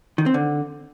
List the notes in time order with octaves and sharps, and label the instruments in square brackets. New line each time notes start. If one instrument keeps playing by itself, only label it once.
[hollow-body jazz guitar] D#3
C4
D3